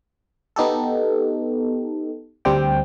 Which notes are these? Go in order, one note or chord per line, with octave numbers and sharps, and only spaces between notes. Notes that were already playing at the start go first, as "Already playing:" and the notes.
B3 D#4 G4 A4
D2 G3 C4 D4 G4 G5